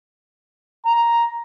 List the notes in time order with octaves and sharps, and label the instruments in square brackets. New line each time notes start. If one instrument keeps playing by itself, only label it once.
[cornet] A#5